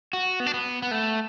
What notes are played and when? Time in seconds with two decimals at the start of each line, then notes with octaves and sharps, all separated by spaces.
0.13 F#4
0.40 B3
0.46 D4
0.54 B3
0.82 B3
0.91 A3